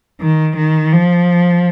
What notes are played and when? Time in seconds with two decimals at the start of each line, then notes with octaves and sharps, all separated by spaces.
0.20 D#3
0.56 D#3
0.92 F3